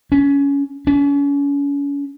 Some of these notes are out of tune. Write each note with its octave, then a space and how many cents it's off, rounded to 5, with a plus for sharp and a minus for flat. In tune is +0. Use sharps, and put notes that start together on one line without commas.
C#4 +20
C#4 +35